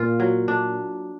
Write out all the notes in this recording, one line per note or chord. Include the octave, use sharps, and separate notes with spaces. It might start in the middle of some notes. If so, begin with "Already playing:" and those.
Already playing: A#2 F4
F#3
D4